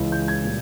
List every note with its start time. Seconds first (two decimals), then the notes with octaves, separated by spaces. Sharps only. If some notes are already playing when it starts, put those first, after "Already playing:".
Already playing: C#2 C#3 E3 G#3
0.12 G6
0.28 G#6
0.44 A#2 G3